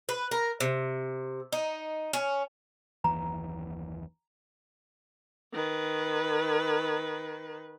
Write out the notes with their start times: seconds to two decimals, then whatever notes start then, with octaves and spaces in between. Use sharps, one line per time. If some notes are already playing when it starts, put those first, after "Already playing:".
0.09 B4
0.31 A#4
0.60 C3
1.52 D#4
2.13 C#4
3.04 F#1 D#2 E3 A#5
5.53 D#3 B4